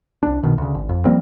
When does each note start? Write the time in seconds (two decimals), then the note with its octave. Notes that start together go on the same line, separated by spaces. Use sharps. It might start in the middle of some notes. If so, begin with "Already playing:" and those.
0.23 C2 D4
0.43 B1 B2 D#3
0.58 D2 C#3
0.75 G#1
0.89 F2
1.05 F3 G3 A#3 C4